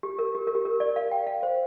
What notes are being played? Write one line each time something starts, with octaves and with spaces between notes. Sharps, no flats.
G4
A#4
G4
A#4
G4
A#4
D5
F5
G5
F5
C5